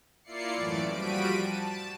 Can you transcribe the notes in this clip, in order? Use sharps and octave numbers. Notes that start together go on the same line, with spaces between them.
A#3 E4 F4 D5 C7 C#7
F#2 A2 E3 A3 D5 D7
F3 G3 F#4 B6 D7 D#7
A5